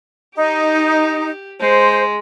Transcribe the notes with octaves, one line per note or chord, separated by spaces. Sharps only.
D#4 G4
G#3 C5